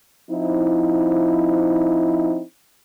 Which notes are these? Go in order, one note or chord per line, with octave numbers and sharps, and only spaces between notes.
F3 C4 D#4 E4